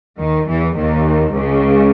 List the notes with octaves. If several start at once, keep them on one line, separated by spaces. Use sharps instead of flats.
D#2 D#3
E2 E3
D#2 D#3
C#2 C#3